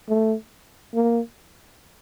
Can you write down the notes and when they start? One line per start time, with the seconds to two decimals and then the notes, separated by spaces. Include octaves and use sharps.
0.09 A3
0.94 A#3